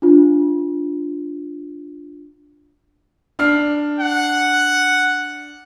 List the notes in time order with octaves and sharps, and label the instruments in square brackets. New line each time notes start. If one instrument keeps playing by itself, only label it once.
[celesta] D4 F4
[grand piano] D4 F6 C7
[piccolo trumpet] F#5